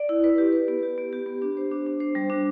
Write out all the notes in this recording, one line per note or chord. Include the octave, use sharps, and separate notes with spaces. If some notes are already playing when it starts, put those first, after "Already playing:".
Already playing: D5
E4
B4
G4
B4
B3
G4
B3
G4
B3
D4
C5
D4
D4
C5
G3
D4